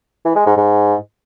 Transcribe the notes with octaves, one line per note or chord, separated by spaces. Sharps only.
E3
G#3
G#2
G#2